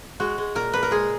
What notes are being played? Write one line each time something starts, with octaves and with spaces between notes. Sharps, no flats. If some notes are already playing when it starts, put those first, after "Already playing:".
G#3 F#4
G#3
A#2 A#4
A#2 B4
A#4
G#3 G#4